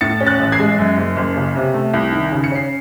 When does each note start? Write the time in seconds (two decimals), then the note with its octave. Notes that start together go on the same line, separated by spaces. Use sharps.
0.01 A2 A6 C#7
0.20 C#4
0.27 F#6 A6
0.39 A1
0.52 G#6 C7
0.59 G#3
0.78 F#2
0.97 F#1
1.17 F#1
1.36 C#3
1.55 C3
1.74 A3
1.94 C2
2.12 D#3
2.32 C#3
2.44 C#7
2.51 C#4 C7